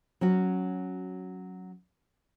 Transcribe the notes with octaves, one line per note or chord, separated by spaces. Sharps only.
F#3 C#4 F#4